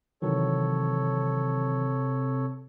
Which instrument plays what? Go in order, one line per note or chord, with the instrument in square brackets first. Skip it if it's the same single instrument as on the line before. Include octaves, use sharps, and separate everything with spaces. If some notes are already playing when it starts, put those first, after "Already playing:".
[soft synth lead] C3 [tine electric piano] D#3 E3 F#3 [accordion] A4 C#5